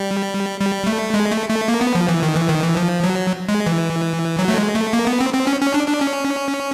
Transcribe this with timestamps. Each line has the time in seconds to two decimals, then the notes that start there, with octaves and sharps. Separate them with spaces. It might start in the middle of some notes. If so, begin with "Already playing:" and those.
Already playing: G3
0.60 G3
0.87 A3
1.14 G#3
1.31 A3
1.50 A3
1.68 A#3
1.81 B3
1.95 F3
2.08 E3
2.23 D#3
2.36 E3
2.49 D#3
2.63 E3
2.77 F3
3.04 F#3
3.49 G#3
3.66 E3
4.39 F#3
4.48 A3
4.57 G#3
4.75 A3
4.93 A#3
5.07 B3
5.20 C4
5.34 C4
5.47 C#4
5.61 C#4
5.74 D4
5.88 D4
6.01 C#4